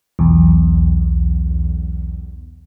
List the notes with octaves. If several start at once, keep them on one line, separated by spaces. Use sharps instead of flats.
B1 E2